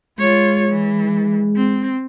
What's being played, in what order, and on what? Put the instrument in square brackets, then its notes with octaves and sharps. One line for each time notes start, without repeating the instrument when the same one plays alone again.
[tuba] G#3 [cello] F4 C#5
[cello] E3
C4